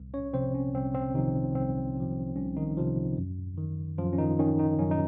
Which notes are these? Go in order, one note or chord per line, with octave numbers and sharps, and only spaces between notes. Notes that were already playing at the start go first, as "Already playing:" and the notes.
Already playing: C2
C#4 C#5
C3 F3 C4 C5
C#4
C2 C4
C4
C3 D#3 F3 D#4
C2 C4
C3 F3
C2 C#4
D#3 D#4
C3 F3
F#2
D#3
F#2 F3 F4
C#4
D#3 D#4
D#3 C#4
D#3 D#4
F#2 C#4
D#4